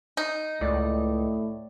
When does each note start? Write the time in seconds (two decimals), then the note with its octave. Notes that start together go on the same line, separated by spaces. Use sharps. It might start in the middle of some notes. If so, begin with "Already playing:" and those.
0.17 D#4
0.61 C#2 A2 D5